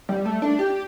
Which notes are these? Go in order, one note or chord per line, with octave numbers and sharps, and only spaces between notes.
G3
A3
D4
G4